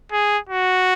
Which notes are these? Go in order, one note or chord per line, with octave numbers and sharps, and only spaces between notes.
G#4
F#4